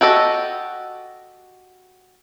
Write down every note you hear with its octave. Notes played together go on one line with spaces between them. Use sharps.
F#4 G4 A4 D#5